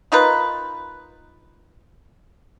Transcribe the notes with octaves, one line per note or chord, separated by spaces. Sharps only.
D#4 F4 A#4 B4